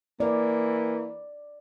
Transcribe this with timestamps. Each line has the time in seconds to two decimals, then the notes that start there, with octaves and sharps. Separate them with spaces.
0.20 E3 A#3 D5